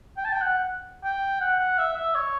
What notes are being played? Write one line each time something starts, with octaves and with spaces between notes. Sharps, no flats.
G5
A5
G5
F#5
G5
F#5
F#5
E5
E5
C#5